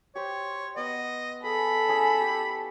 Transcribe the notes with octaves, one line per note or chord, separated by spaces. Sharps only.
G4 C5 C#5 G5
B3 D#5 F#5 C#6
G#4 A4 B5
C#4 E4 G#4
G4